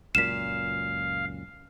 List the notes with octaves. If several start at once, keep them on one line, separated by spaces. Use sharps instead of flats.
C#2 F#2 A#2 F5 B6 E7